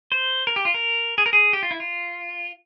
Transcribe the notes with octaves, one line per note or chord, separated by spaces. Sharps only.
C5
A#4
G4
F4
A#4
G#4
A#4
G#4
G4
F4
E4
F4